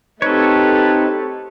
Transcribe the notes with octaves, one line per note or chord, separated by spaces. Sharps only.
A3 C4 D#4 G4 A4 B4 C#5